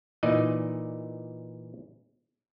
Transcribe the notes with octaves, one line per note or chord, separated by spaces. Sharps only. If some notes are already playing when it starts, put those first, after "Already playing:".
A#2 E3 D#4 D5 D#5